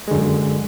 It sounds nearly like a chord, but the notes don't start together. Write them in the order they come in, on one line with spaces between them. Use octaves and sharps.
G#3 D3 F#2